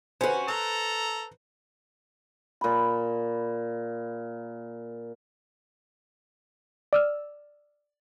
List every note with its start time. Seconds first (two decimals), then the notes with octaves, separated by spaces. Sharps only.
0.21 C#4 F#4 B4 C5
0.48 A4 A#4 A#5
2.61 A#2 B5
6.93 D5 E6 F6